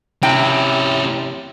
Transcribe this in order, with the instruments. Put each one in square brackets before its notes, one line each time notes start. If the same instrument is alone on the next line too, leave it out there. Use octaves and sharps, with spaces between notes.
[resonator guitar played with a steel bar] C3 G5 [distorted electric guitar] C#4 E4